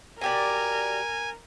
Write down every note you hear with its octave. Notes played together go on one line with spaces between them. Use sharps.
B2 G4 A#4 D5 G#5